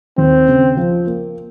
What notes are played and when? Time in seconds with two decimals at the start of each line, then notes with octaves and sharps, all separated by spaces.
0.18 D#2 C4
0.48 C#3
0.77 F3
1.07 A#3